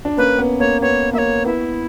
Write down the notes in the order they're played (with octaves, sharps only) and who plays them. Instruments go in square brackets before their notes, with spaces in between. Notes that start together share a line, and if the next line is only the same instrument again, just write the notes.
[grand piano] D4
[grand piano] A#3 C#4 [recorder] B4
[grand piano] B3
[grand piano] A#3 [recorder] C#5
[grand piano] B3 [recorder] C#5
[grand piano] A#3 [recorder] E5
[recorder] C#5
[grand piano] B3 [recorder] E4